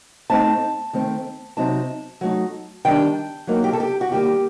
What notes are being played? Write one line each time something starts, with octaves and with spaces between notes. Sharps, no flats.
A2 A3 C4 D#4 A5
D#3 A3 C4
C3 F#3 C4 D#4 A5
F#3 A3 D#4
D#3 G3 D4 G5
F#3 A#3 D#4
G4
A4
G4
F#4
D#3 G3 A#3 G4